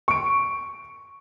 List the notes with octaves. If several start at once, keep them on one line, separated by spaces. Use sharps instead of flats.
C#6 D7